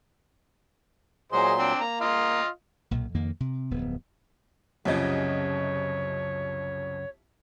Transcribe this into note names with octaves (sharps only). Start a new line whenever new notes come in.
A#2 F#3 G#4 C5 D#5 C6
C4 D4
A#3 A#5
F4 D#5 F5
B1 A#2
F2 D#3 A#3
C3
D1 F2 B3
C2 F#2 C#3 F3 C#5 D#5